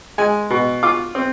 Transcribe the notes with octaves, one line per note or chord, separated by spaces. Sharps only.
G#3 G#5
B2
F4 D6
C4